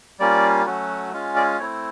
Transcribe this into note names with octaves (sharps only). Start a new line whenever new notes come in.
G3 A#3 C#4 F4 D5
F#3 A3 C#4 F#4
G#3 C#4 F4
D5
A3 C4 E4 C#5